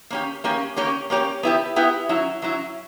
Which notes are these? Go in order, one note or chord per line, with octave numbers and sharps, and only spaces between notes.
A#3 C#4 G4
A#3 C#4 G4
A#3 C#4 G4 C#5
A#3 C#4 G4 C#5
B3 E4 G4
B3 E4 G4
F#3 C#4 E4
F#3 C#4 E4